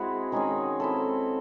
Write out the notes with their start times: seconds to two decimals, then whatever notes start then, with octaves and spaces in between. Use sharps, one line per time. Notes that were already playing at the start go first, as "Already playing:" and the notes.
Already playing: G#3 C4 E4 F#4 G#4
0.32 D#3 G#3 C#4 G#4
0.80 C4 E4 A4